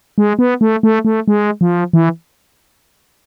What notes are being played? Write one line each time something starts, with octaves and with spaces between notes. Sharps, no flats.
G#3
B3
A3
A3
A3
G#3
F3
E3